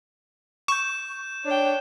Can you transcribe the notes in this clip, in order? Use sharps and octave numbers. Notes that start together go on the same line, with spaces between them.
C#6 G6 E7
D4 C#5 G5